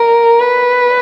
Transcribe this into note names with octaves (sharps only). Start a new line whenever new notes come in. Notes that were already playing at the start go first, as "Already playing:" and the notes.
Already playing: A#4
B4